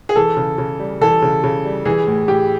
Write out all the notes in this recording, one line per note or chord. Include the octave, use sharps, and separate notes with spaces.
G#4
E3 A4
C#3
C#3
G3
E3 A4
C#3
C#3
G3
E3 G#4
A2
A2 G4